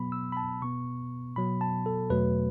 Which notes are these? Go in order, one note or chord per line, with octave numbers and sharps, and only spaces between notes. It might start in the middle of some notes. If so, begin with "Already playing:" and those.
Already playing: B2 F#3 B3 B5
E6
B5
A5
B2 B3 C#6
B2 F#3 B3 B5
A5
A4
E2 B2 F#3 A3 B4